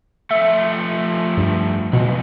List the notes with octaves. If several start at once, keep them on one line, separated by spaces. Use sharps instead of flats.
F3 A3 E5
G2
B1 E2 B2